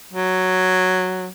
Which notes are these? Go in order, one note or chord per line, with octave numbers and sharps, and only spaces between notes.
F#3